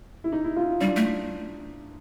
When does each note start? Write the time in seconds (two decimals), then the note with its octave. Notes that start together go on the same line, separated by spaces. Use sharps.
0.24 E4
0.32 D#4
0.44 E4
0.56 F4
0.81 G3 D4
0.96 A3